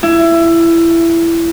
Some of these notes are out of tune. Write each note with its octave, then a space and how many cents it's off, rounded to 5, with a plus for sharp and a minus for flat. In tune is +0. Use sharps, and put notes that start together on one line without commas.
E4 +20